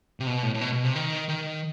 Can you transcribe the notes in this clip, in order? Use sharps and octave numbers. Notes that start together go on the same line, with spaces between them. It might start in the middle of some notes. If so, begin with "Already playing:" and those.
C3
B2
A2
A2
B2
B2
C3
D#3
D#3